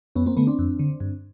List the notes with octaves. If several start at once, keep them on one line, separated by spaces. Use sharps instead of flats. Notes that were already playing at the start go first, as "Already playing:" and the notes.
F2 B3 C#4
A#3 C4
D3 A3 B3
C4 D4
F2
D3
G2